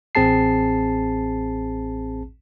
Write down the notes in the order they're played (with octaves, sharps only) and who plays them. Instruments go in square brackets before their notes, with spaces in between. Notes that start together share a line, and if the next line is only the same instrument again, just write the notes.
[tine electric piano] A1 C4 G#4 A5 C7